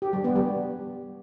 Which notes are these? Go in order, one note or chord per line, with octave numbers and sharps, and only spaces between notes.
G4
G3
B3
G3